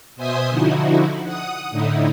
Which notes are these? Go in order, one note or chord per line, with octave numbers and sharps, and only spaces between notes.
B2 C5 E5 G#5 C6 D#6
D3 F3 D#4 E4 F#4
F#5 D#6
A2 D3 D#4 E4